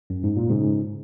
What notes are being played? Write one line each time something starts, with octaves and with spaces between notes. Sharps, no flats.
F#2
G#2
A#2
G#2 C#3